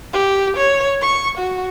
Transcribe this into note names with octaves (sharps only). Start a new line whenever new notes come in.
G4
C#5
C#6
F#4